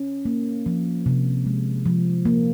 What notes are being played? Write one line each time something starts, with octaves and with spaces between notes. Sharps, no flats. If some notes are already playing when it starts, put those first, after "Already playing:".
Already playing: C#4
A#3
F3
C3
G#3
F3
A#3